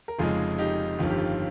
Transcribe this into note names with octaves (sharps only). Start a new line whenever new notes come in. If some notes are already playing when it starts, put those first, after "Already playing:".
A#4
F1 F2 C#3 G#3 D#4 F4 G#4
D#4 G4
G1 F2 D#3 F4
G4
F4